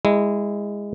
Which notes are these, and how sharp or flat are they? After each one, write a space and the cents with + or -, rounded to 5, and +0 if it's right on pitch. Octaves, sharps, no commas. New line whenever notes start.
G#3 -20 E4 +0